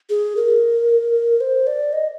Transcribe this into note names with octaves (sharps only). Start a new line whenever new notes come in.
G#4
A#4
C5
D5
D#5